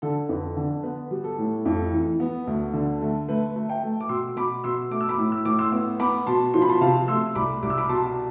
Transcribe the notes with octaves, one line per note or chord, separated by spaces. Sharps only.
D3 A4
F2 B4
D3
B3 B4
G3
A4
A2
F2
E3
B3
D2
D3
A3
A3 B4
A3
E5 G5
A3
D6
B2 C6 E6
B2 B5 D6
B2 C6 E6
A3 D6
E6
B5 D6
A2
E6
A2 D6
C6 E6
B3
B3 B5 D6
B2 A5 C6
F3 C6
B5
A5 C6
C3 F5 A5
A3 C6 E6
C2 B5 D6
C2 D6
E6
B5 D6
B2 A5 C6
A5